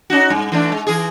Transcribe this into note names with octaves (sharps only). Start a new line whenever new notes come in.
C#4 D#4 F#4
G2
E3 A3 D4
G#3
E3 G#4